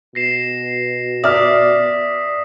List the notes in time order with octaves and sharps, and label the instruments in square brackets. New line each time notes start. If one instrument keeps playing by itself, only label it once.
[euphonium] B2 [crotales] A#6 C7 E7
[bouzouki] D5 [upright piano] E5 F6 [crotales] D#6 B6